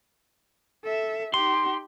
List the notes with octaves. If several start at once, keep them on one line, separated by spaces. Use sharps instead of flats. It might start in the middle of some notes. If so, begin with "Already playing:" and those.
A4 E5
D#4 G4 C6